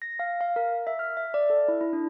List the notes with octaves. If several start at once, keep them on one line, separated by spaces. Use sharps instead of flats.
A#6
F5
F5
A#4
E5
F6
E5
D5
A4
E4
E4
D4